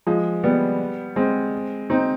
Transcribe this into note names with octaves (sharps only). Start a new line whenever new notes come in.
F3 G#3
G3 B3
G#3 C4
C4 D#4